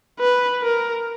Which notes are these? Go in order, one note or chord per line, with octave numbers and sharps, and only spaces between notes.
B4
A#4